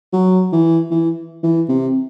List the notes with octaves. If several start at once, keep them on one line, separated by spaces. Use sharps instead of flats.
F#3
E3
E3
E3
C3